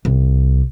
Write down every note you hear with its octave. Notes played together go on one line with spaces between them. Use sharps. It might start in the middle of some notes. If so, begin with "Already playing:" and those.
C2